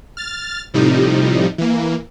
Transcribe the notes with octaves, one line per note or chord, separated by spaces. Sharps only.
F6 A6
A2 C3 F3 G3 D#4
E3 A#3